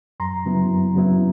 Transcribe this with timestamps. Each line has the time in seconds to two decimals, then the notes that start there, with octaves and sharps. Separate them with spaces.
0.20 F#2 A#5 C6
0.45 C#3 F#3 B3 E4
0.70 F#2
0.95 C#3 F#3 B3 E4